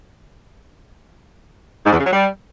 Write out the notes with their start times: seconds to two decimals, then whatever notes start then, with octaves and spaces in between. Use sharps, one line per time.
1.86 G#2
1.93 E2
1.99 C#3
2.06 F#3
2.13 G3